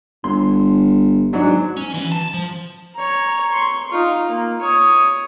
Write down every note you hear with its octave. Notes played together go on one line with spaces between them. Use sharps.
G1 C6
G#2 F#3 D4
C#4
E3
A5
F3
C#5 A#5
C6 C#6
D#4 F4
A#3
C#5 D#6